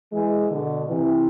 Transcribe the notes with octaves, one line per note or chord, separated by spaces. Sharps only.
E3 G#3
B2 D3
C3 E3